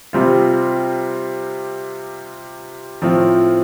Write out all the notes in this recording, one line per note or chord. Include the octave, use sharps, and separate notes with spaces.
C3 G3 C4 F4
A2 F3 C4 F4